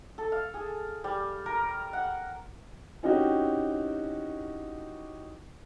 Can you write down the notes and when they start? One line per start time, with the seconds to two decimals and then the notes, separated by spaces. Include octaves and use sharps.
0.18 A4
0.32 F5
0.54 G#4
1.04 G3
1.46 A#4
1.93 F#5
3.03 C4 C#4 D#4 E4 F#4 G4